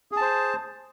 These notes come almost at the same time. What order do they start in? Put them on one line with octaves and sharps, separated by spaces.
G#4 A5 C5